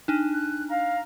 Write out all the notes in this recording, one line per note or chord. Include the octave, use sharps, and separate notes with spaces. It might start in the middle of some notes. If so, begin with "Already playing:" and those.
D4 D#4
F#6
F5 A#5